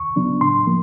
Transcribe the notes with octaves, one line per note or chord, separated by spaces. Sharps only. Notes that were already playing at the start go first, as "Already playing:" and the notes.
Already playing: D#2 C#6
C#3 F#3 B3 D4
A2 C6
F3 A#3